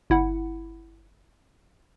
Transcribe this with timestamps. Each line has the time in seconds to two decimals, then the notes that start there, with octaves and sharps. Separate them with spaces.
0.10 G1 E4 F#5